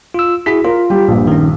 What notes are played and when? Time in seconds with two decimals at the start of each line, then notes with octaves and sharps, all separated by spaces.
0.14 F4 E6
0.46 E4 F#4 G#4 B6
0.64 F4 A#4
0.90 G3 G4
1.08 A#1 G2
1.27 D#3 C#4